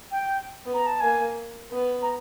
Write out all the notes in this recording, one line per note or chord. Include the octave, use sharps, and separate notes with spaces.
G5
B3
A#5
A5
A#3 G#5
B3
A#5